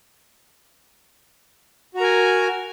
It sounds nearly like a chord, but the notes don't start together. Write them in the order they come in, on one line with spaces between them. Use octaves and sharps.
F#4 A#5 A#4 G#5